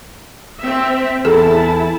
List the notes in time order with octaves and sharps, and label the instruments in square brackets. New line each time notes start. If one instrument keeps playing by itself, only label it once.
[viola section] C4 E5
[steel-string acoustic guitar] E2 [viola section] E4 A5 [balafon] G#4 A4